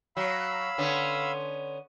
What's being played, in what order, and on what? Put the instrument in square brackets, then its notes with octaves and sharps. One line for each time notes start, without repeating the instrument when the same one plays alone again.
[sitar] F#3 [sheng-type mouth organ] F5 B5 E6
[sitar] D3 B3 C#4